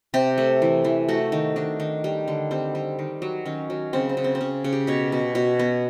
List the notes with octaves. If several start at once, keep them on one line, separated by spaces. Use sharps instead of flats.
C3 G4
A3
E3
E3
A3 F#4
D#3
D#3 D4
D#3
G3
D3
G3 C4
G3
D#3
F#3
D#3 C#4
F#3
C#3 C4
C4
C#3
C4
C4
C#3 C#4
C#3
G4
B2 C#5
B2
B2 C#5
B3